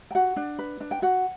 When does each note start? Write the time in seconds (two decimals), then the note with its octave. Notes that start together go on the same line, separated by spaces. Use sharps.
0.11 G5
0.15 F#4 F#5
0.36 D4
0.59 B4
0.80 D4
0.91 G5
1.02 F#4 F#5